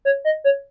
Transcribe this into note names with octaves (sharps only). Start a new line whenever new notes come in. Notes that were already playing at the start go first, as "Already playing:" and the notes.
C#5
D#5
C#5